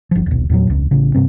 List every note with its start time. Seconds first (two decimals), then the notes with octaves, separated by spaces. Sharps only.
0.11 G1 F3
0.26 D#1 B1
0.50 E2 A#2 F3 F#3
0.67 E1 C#2
0.91 A1 C#3
1.14 G2 C3 C4